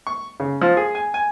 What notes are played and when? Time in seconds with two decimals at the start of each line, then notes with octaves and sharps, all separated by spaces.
0.07 C#6
0.40 C#3
0.62 F3
0.77 G#4
0.95 G#5
1.14 G#5